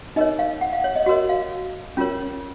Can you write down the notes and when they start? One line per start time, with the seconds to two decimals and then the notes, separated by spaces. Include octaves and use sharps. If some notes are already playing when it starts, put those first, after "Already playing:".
0.16 D#4 A#4 C#5 D#5
0.39 F5
0.61 F#5
0.73 F5
0.84 C#5
0.96 D#5
1.06 F#4 A#4 C#5 D#5
1.29 F5
1.97 C#4 F4 A#4 C#5